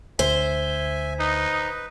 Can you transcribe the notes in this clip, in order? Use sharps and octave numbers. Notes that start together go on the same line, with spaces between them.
D2 C5 E5 G#5
D#4 B4